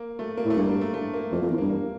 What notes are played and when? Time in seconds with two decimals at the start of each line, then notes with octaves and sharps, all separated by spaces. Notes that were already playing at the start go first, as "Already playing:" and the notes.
Already playing: A#3
0.19 A3
0.37 A#3
0.45 A2
0.50 A3
0.56 G2 A#3
0.69 A#3
0.81 A3
0.94 A3
1.14 A#3
1.32 F2 A#3
1.42 F2 A#3
1.50 E2
1.58 G2 A#3
1.70 A#3